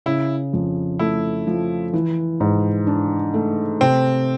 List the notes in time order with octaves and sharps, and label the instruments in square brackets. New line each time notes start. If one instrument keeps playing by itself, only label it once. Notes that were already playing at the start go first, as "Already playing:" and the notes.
[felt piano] C#3 [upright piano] E4
[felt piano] F2
[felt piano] A3 [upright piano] E4
[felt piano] F3
E3
G#2
D4
A3
[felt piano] C3 [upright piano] C4